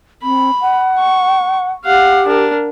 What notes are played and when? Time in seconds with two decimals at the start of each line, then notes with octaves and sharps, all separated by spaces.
0.23 C4 B5
0.60 F#5
0.99 C#6
1.85 G4 F5 F#5
2.26 D4 A#4